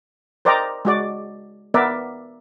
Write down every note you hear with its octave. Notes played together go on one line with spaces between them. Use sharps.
A#4 C5 D5 D#5 G5 A#5
G#3 F#4 D5
B3 A#4 D5 E5